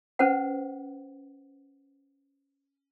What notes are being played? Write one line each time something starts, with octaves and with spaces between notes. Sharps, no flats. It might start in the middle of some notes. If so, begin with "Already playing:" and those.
C#4 B4 C5 F#5